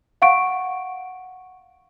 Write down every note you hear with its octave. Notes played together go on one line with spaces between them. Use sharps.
F5 F#5 C#6 D7